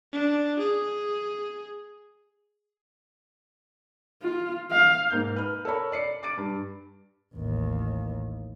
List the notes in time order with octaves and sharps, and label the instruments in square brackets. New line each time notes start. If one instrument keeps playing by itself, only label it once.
[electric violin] D4
G#4
[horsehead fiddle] F4
F5
[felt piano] G#2 A#3 G6
B4 F6
A4 A#4 C#5 B5
D5 C7 C#7
D6 A6 D7
G2
[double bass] A1 D#2